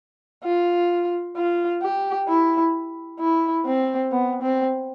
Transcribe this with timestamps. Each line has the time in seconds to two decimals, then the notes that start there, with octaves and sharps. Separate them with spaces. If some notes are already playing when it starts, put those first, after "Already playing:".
0.44 F4
1.36 F4
1.82 G4
2.28 E4
3.20 E4
3.66 C4
4.11 B3
4.42 C4